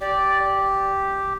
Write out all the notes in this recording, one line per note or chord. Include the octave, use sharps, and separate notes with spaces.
G4 D5